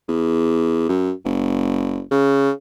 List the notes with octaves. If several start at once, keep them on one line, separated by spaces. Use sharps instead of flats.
E2
F#2
F#1
C#3